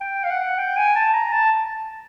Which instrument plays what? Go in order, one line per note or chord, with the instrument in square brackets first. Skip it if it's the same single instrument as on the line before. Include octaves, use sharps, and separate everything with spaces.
[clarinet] G5
F5
F#5
G5
G#5
A5
A#5
A5